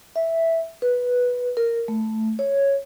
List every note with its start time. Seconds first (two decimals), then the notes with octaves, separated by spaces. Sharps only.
0.16 E5
0.82 B4
1.57 A#4
1.88 A3
2.39 C#5